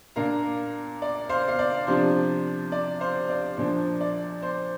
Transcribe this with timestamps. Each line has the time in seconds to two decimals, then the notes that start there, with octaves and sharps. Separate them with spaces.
0.16 A#2 A#3 D4 F5 A#5
1.02 D5
1.29 C5 F5
1.48 F5
1.59 D5
1.87 C3 F3 D4 C5
2.72 D5
3.00 C5 F5
3.30 D5
3.57 A#2 F3 D4 C5
4.01 D5
4.42 C5